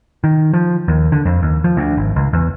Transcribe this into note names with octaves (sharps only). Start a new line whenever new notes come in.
D#3
F3
D#2
D3
F2
D#2
F3
D2
G#1
C#2
E2